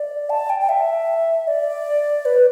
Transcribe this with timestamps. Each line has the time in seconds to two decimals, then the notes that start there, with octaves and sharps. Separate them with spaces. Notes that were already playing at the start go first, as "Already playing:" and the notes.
Already playing: D5
0.30 A5
0.49 G5
0.60 G5
0.69 E5
1.47 D5
2.25 B4